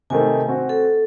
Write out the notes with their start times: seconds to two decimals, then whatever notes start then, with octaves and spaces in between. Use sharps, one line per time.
0.10 C3 D#3 A3 G#5
0.48 C4 F#4
0.69 A4